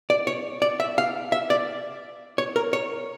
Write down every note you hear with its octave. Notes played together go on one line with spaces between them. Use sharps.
D5
C#5
D5
E5
F5
E5
D5
C#5
A#4
C#5